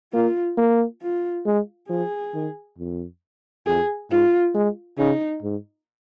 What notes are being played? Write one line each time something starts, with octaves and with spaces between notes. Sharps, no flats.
A#3 F4
A#3
F4
G#3
F3 G#4
D#3
F2
F2 G#4
G#2 F4
G#3
C#3 D#4
G#2